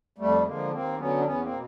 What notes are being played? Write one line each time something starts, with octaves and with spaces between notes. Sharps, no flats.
F2 G3 A3
D3 F3 G#3 A#3
D#2 A#3 C4
D3 F#3 B3 C#4
D4
E2 B3 C#4
A#3 C4
B2